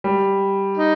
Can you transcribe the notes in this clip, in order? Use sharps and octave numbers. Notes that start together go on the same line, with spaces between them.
G3
D#4